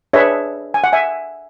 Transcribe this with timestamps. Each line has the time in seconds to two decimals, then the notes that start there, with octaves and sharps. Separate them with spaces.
0.13 D4 G#4 B4 C#5 E5
0.74 G#5
0.84 F#5
0.93 E5 G#5